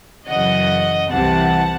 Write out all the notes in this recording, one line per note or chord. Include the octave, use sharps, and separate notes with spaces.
F#2 C#3 E3 D#5 F#5
C2 C3 E3 F#5 A5